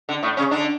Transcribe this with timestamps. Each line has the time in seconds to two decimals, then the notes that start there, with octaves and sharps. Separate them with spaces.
0.09 D3
0.23 A2 A3
0.37 C#3 C#4
0.51 D3 D4